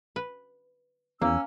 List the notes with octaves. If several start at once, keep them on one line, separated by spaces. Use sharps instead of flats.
B4
E2 A#3 C#4 E6